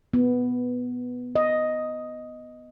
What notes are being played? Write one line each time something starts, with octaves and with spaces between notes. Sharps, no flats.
B3
D#5